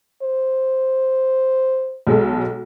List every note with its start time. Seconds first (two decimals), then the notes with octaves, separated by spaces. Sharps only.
0.23 C5
2.07 B1 G#3 A4